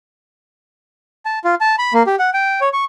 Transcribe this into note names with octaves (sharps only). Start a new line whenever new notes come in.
A5
F4
A5
B5
A#3
G4
F#5
G5
C#5
C#6